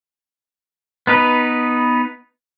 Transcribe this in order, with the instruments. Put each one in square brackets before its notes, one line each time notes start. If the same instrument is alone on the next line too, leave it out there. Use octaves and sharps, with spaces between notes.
[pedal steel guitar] B3 D#4 B4